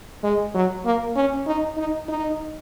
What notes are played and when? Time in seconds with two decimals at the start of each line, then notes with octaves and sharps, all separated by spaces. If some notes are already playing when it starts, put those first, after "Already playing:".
0.24 G#3
0.55 F#3
0.85 A#3
1.16 C#4
1.47 D#4
1.77 D#4
2.08 D#4